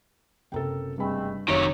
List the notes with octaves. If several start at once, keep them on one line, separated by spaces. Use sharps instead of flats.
F#1 C3 A4 A#4 G5
G2 G#3 A3 C4 B5
F1 D#3 F#3 C#5 E5